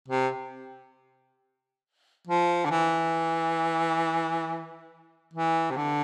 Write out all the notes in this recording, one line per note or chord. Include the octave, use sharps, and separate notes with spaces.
C3
F3
D3
E3
E3
C3
D3